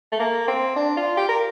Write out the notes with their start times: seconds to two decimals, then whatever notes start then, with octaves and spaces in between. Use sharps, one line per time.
0.12 A3
0.20 A#3
0.48 C4
0.76 D4
0.97 F4
1.17 G4
1.29 A#4